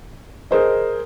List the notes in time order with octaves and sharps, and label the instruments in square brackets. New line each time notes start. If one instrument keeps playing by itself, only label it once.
[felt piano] G#4 A#4 C5 D#5